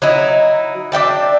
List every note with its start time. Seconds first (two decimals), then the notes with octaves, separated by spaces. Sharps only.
0.02 F#3 D#4 E4
0.92 D4 E5 G5 A5